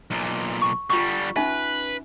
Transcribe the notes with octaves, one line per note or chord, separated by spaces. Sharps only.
B1 A#2
C#6
D3 G3 F4 C#6
C#4 D#4 B4 E5